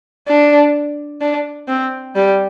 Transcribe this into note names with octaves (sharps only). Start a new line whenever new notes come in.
D4
D4
C4
G3